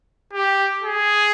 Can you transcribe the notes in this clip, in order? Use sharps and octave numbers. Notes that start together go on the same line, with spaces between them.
G4
G#4